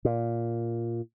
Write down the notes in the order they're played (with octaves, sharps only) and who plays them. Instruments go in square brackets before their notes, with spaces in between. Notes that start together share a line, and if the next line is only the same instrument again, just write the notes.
[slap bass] A#2